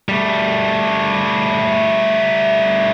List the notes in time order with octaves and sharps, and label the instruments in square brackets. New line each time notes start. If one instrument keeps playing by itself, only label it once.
[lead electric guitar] G3 A3